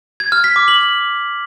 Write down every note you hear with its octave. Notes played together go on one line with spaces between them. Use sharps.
G#6
F6
B6
D6
F#7